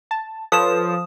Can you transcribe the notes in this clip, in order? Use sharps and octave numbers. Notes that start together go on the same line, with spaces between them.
A5
F3 A4 B4 C#5 D#6 E7